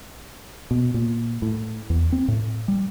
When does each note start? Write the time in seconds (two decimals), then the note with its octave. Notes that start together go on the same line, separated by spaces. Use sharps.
0.71 B2
0.94 A#2
1.42 A2
1.90 E2
2.12 C4
2.28 A2
2.68 G3